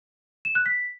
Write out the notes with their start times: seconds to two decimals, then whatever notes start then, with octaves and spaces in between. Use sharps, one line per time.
0.45 E7
0.55 F#6
0.66 B6